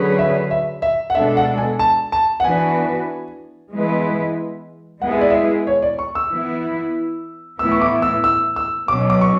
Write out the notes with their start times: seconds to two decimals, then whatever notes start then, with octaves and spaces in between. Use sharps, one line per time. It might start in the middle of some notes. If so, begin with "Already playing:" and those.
Already playing: D3 F#3 C#4 G#4 B4
0.19 E5
0.51 E5
0.82 E5
1.10 F#5
1.15 B2 G#3 D4 A4 E5
1.37 F#5
1.58 G#5
1.79 A5
2.12 A5
2.40 F#5
2.44 E3 B3 D4 F#4 B4 G#5
3.74 E3 G#3 B3 E4 B4
5.02 G#3 B3 E4 G#4 F#5
5.12 E5
5.21 D5
5.30 E5
5.67 C#5
5.82 D5
5.99 C#6
6.15 E6
6.31 E3 B3 E4
7.59 A2 E3 B3 E4 E6
7.71 C#6
7.81 D6
8.02 E6
8.24 E6
8.56 E6
8.88 B2 F#3 C#4 D6
9.10 D6
9.21 C#6